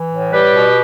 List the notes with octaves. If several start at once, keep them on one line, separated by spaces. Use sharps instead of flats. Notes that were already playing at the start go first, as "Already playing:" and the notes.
Already playing: E3
A2
G3 G4 B4
B2